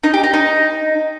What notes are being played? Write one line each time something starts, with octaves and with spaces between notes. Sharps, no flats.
D#4
G4
D#4
D#4